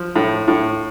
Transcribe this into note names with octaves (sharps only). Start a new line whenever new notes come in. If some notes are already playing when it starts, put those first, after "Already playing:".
Already playing: F3
A2
A2